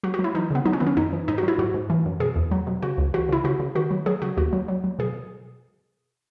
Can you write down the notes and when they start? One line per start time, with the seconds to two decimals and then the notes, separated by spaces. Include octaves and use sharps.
0.03 F#3 F#4
0.14 F#4
0.19 F#3
0.24 E4
0.35 E3 D#4
0.51 C#3 B3
0.65 F#3 D#4
0.73 C#4
0.80 D#3 B3
0.87 C#4
0.97 F#2 D#4
1.13 E3
1.28 G#2 D#4
1.38 F#4
1.43 F#3
1.48 E4
1.58 G#2 F#4
1.74 G#2
1.90 E3
2.06 F#2
2.20 B2 G#4
2.36 E2
2.51 F#3
2.67 B2
2.82 C#3 F#4
2.98 C#2
3.14 E3 F#4
3.29 C#3 E4
3.44 C#3 F#4
3.60 C#3
3.75 D#3 F#4
3.91 F#3
4.06 F#3 G#4
4.22 C#3 F#4
4.37 D#2 F#4
4.53 F#3
4.68 F#3
4.84 F#3
4.99 B2 G#4